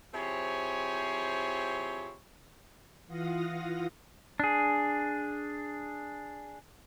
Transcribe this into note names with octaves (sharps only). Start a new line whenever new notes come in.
F3 C4 E4 G4 G#4 C#5
E3 F4 F5 F#5 D#6 A#6
D4 G#4